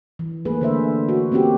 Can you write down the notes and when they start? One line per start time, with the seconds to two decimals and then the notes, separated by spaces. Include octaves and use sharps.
0.19 E3
0.45 A3 A#3 G#4 B4
0.61 D3 C5 E5
1.09 F#4
1.32 A#3 C4 C#4 F#4 G4